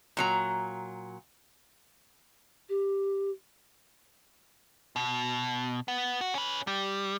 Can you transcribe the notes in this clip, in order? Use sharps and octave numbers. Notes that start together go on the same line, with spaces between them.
A#2 F#3 A#5
G4
B2
B3
F#4
C#4 B4
G3